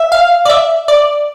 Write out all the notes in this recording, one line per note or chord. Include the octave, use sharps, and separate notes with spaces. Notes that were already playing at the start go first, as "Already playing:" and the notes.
Already playing: E5
F5
D5
E5
D5